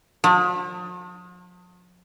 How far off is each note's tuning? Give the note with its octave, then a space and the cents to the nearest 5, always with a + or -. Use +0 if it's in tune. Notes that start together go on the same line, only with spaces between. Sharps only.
F3 +45